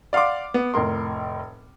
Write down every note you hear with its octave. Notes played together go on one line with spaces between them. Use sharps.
D5 F5 F#5 C6 D6
B3
F1 A2 A#4 C6